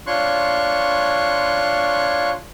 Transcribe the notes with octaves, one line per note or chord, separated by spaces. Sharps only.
D4 F4 C#5 C6 C#6 F#6